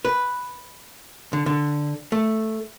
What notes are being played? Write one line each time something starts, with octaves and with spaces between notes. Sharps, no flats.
B4
D3
D3
A3